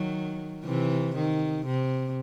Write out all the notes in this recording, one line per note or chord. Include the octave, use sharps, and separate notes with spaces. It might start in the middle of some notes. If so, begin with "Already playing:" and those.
Already playing: D#3 F#3
C3 E3
D#3
C3